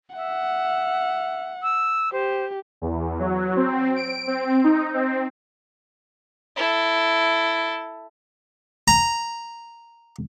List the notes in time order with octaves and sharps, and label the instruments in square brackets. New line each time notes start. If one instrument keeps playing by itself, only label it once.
[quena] E5 [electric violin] F#5
[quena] E6
[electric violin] G4 [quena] C5
[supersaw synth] E2
F#3
C4
D7
C4
D#4
C4
[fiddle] E4 A4
[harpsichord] A#5